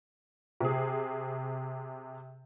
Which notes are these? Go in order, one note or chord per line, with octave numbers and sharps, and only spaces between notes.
C3 G#4